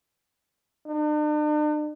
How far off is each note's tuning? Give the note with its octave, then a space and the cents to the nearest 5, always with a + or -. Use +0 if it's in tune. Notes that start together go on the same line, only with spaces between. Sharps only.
D4 +45